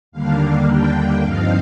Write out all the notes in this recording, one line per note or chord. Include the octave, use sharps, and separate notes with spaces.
D#2 D3 G3 A#3 D4 F5
G5
G2 F3 C4 D#4 F5